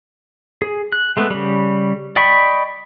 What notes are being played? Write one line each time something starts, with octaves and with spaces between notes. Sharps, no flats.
G#4
F#6
G#3 A3 B3
C#3 G3
D5 D#5 G5 B5 C#6